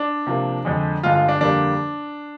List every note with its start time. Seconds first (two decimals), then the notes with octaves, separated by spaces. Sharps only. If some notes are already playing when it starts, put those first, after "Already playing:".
Already playing: D4
0.27 C3 F3 A#3
0.65 F2 D3 G#3
1.03 G2 D3 G#3 F4
1.15 F4
1.28 D4
1.41 F2 D3 G3 A#3 D4